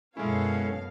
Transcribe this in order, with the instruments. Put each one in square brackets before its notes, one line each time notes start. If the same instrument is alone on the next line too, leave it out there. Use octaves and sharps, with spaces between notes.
[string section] F#2 B2 F5 [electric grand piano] G#3 E4 [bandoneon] C#4 [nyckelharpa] A4 C#5